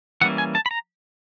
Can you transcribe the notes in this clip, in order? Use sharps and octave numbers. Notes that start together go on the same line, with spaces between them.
E3 G3 A#3 C#4 F#5
G#5
A5
B5
A#5